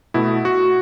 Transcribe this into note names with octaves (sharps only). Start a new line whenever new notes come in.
B2 A3 E4
F#4